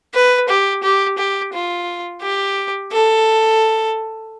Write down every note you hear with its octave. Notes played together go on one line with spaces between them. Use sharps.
B4
G4
G4
G4
F4
G4
A4